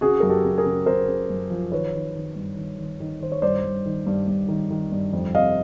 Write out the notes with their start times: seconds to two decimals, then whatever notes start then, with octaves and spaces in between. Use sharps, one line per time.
0.01 C#3 F#4 G#4
0.20 F#2 A#4
0.30 G4 A4
0.45 C#3
0.58 G#4 A#4
0.66 C#3
0.86 C#3 A#4 C5
1.08 C#3
1.30 F#2
1.50 F3
1.72 D#3 B4 C#5
1.94 D#3
2.15 D#3
2.36 G2
2.57 D#3
2.78 D#3
3.00 D#3
3.21 D#3 C5
3.32 C#5
3.42 G2 C5 D5
3.64 G2
3.86 D#3
4.06 G2
4.27 G2
4.48 D#3
4.71 D#3
4.92 G2
5.13 F2
5.34 C3 D#5 F5